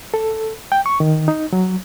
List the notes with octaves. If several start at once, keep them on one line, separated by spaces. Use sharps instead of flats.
A4
G5
C#6
D#3
D#4
F#3